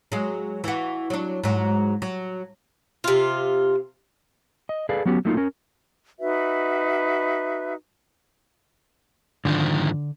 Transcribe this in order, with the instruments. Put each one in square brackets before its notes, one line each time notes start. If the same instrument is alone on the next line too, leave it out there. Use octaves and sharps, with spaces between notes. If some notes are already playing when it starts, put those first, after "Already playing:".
[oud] F#3 G#3
E3 F#4
F#3 D4
G#2 F#3
F#3
[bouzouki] C3 F4
[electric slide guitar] D#5
G#4 A4 B4 D5 F5
F#3 B3 C#4 F#4 G4
F#3 A3 A#3 D#4 F4
C#4 A#4
[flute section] D#4 F#4 B4 E5
[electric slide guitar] G#2 D#3 F3 [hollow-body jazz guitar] D3